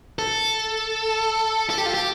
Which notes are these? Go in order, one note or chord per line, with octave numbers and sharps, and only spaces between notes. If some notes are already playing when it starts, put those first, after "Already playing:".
A4
A4
G4
F4
G4